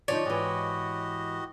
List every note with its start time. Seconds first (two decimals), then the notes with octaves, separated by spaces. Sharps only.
0.08 D3 F3 D#4 C#5 D5
0.25 G#2 E3 F#4 G4 D#5